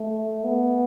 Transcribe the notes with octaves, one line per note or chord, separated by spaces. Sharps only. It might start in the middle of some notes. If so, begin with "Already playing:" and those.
Already playing: A3
B3